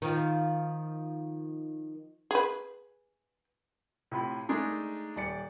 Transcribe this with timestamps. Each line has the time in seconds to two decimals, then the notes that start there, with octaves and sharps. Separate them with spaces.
0.02 D#3 F3
2.31 G#4 B4
4.11 A2 C3 F4 B5
4.49 G#3 A3 D4 D#4 G#4 A#4
5.16 D#1 D5 C#7